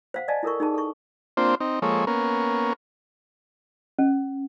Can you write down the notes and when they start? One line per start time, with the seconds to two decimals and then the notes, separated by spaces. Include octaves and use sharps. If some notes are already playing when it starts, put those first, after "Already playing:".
0.14 C5 F5 F#5
0.28 D5 D#5 F5 G#5 A5
0.43 E4 A4 A#4 C#6
0.60 D#4 G#4 A5
0.74 A4 C#6
1.37 A#3 C4 D4 F4 C5
1.60 C4 D#4
1.82 F3 G#3 A#3 A4 C#5
2.07 A#3 B3 C#4 A#4
3.99 C#4